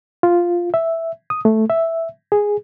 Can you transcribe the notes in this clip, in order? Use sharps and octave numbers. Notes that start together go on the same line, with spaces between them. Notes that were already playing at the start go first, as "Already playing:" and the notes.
F4
E5
D#6
A3
E5
G#4